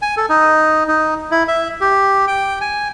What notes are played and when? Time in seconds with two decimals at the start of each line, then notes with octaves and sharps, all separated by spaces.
0.02 G#5
0.17 A4
0.29 D#4
0.88 D#4
1.31 E4
1.48 E5
1.81 G4
2.27 G5
2.61 G#5